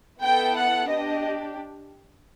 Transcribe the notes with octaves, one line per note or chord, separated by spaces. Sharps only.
B3 E4 A4 G5
F#5
D4 G4 D#5